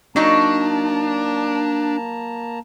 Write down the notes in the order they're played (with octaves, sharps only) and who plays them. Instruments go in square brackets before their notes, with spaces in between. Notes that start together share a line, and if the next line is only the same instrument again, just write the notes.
[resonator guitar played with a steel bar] F#3 D#4 [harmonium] A#3 A5 A#5 [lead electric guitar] D4